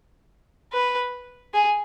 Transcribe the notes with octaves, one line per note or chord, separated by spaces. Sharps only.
B4
G#4